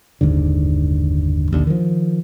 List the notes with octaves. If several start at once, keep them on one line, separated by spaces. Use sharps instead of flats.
F#1 D#2 G#2 D3
A#1 D#2 D3
D#3 F3